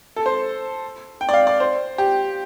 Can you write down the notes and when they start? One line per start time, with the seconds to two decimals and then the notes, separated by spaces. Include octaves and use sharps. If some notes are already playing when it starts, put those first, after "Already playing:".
0.16 A4
0.26 C5
1.21 G5
1.29 D5
1.34 F5
1.47 D5
1.60 C5
1.98 G4